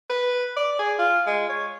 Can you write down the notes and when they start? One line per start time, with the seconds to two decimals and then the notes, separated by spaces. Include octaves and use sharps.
0.09 B4
0.56 D5
0.79 G#4
0.99 F4
1.26 G#3
1.49 C#5